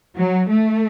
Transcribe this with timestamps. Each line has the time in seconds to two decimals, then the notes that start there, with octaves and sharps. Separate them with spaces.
0.17 F#3
0.51 A3